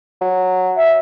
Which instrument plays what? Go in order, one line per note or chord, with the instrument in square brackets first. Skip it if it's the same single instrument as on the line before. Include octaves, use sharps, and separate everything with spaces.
[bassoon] F#3
[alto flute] E5